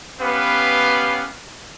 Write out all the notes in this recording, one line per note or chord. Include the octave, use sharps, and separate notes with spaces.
B3 C#4 G4 B4 F5